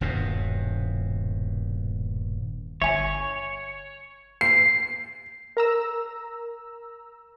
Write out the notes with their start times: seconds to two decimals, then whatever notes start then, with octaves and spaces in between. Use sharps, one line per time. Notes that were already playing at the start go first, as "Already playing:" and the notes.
0.01 D#1 G2 B2
2.82 G1 C#5 E5 G#5
4.41 C7
5.57 A#4 A#5 E6